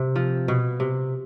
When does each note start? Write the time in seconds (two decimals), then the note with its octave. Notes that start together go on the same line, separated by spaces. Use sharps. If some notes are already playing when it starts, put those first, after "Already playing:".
Already playing: C3
0.16 F3
0.48 B2
0.80 C3